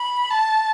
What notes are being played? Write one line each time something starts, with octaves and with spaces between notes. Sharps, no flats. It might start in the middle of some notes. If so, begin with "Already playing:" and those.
Already playing: B5
A5